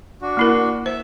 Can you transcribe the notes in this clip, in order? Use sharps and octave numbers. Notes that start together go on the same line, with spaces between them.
D4 F#4
A#3 E4 A#4
C5 E5